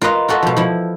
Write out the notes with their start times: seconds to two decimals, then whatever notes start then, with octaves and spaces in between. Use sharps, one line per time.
0.01 F4 A#4 B4 D#5 F5
0.28 F4 F#4 A4 D#5 E5
0.42 B2 F3
0.57 F3 E4